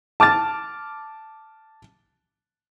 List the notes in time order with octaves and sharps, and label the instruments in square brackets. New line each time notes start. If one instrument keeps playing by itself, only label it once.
[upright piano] A5 D6 F6 A6